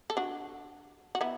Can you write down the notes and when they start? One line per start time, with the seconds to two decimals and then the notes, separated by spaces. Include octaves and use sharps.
0.10 A4
0.17 D4 F#4
1.15 F#4
1.21 B3 E4